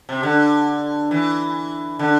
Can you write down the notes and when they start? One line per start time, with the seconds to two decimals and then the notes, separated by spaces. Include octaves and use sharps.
0.09 C3
0.23 D3
1.11 E3
1.99 D3